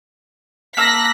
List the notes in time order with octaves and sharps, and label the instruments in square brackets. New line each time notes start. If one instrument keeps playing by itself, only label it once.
[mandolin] A#3 A5 E6 [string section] F#6 A#6 B6